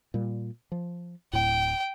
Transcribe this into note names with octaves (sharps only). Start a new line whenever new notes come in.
A#2 G3
F3
D1 A2 G5